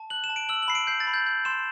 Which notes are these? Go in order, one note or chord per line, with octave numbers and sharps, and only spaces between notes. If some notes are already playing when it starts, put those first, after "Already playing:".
Already playing: A5
F#6 F#7
E7
A5
D7
E6 F#7
F#7
B5 C7
D7
G6 C7
A6
B5
G6
G6
C6 E7